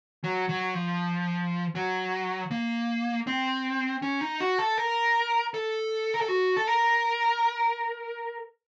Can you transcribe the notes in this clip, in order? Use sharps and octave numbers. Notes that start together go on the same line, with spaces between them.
F#3
F#3
F3
F#3
A#3
C4
C#4
D#4
F#4
A4
A#4
A4
A#4
A4
F#4
A4
A#4